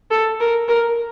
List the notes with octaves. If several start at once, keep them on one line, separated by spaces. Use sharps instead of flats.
A4
A#4
A#4